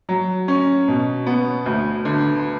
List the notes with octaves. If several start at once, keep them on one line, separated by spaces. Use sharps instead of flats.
F#3
C#4
B2
B3
D2
D3